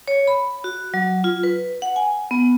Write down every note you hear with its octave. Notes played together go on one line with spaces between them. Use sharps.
C#5
B5
F#4
F#3
F4
B4
F#5
G#5
B3